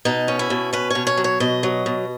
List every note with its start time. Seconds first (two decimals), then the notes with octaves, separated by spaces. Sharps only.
0.05 B2 D#4
0.28 C#4
0.39 E4
0.50 B2
0.73 C#4 B4
0.90 B2 C#5
1.07 C#5
1.17 F#3
1.24 C#5
1.40 B2 D#5
1.63 F#3
1.86 B2